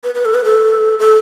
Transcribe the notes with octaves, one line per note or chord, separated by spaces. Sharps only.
B4
B4
A4
B4
A4
A4